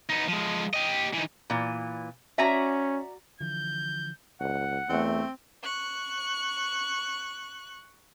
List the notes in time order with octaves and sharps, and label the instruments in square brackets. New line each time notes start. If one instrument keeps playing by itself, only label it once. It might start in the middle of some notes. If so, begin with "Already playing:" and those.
[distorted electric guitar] B3 D#4
F3 G#3
G4 D#5
E3 D#4
[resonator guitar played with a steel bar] A#2 E3
[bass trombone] C#4 [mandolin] F#4 D5 A#5 [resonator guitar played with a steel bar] E5 G#5
[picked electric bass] D3 E3 F3 [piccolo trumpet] G6
[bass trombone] C#2 [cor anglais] F#5
[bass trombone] E2 [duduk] A3 [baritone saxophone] C4
[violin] C#6 F#6